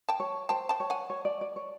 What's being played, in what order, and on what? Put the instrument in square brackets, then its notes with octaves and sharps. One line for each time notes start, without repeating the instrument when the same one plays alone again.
[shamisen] G5 A5
[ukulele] C#5
[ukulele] C5 [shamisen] G5 A5
[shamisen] G5 A5
[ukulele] C#5
[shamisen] F#5 G#5
[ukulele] C#5
D5
D5
C#5